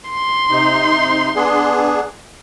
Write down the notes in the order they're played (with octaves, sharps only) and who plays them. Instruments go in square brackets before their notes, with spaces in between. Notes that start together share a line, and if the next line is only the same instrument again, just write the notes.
[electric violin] C6
[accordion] C3 D#4
B3 D4 G#4